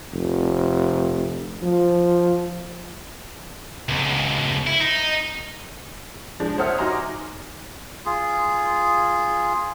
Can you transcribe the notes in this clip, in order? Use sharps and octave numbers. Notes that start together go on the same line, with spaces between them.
F1
F3
C#2 B2
E4
D#4
F3 G#3 D4
C5 C#5 E5 F#5 D#6 F6
D#4 F#4 D#5 G#5 A#5 C6
D6
F4 G#4